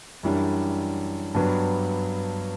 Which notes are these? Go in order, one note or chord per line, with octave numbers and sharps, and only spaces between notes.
F#2 E3 G3 D4
G2 F#3 B3 D4